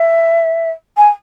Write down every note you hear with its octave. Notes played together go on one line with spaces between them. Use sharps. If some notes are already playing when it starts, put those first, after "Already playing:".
Already playing: E5
G#5